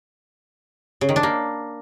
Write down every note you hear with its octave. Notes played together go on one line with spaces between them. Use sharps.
C#3
D#3
D4
A#3